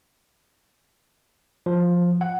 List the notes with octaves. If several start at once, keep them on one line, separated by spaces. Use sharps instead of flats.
F3
F#5